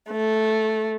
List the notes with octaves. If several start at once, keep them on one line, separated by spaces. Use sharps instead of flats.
A3